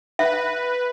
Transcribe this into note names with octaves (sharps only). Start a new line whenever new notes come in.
B4 E5